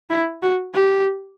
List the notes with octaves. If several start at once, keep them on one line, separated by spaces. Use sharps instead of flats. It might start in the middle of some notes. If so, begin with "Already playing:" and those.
E4
F#4
G4